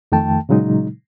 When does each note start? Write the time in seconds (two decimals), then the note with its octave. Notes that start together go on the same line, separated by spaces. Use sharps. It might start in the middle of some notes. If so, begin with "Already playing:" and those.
0.12 F2 D#3 A3 G5 A5
0.49 A#2 C#3 F#3 G#3 D#4